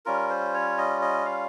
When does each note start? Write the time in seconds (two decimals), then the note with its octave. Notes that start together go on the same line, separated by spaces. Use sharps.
0.05 G3 C#4 F4 A#4
0.30 C5
0.54 C#5
0.78 D#5
1.02 D#5
1.26 F5